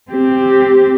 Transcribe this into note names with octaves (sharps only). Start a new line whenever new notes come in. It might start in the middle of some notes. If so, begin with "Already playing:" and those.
C4 G4